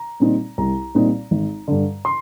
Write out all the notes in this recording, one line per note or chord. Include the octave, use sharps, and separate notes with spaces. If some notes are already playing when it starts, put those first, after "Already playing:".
Already playing: A#5
A#2 G3 C4 D#4
C2 A#5
A#2 G3 C4 D#4
G#1
G2 D3
C6